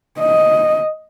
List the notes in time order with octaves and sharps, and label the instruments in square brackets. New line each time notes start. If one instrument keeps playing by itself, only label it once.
[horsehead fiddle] D#5